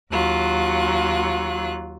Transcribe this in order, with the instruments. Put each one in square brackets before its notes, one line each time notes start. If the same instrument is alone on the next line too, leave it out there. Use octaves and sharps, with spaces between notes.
[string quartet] D#2 F#3 F4 F#6